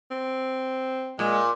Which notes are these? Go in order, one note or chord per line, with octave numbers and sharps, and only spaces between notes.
C4
A#2 G#3